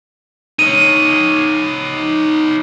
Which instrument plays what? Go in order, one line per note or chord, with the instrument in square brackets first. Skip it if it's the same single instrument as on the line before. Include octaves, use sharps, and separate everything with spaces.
[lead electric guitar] D#4 C#5 [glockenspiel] D#7